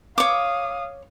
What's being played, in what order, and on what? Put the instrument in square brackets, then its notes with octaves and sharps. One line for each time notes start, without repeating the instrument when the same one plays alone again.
[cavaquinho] C#5 D6 [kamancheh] F5 D#6